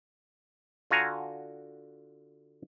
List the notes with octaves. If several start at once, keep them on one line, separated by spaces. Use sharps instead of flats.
D3 F4 F#4 G#5 A#5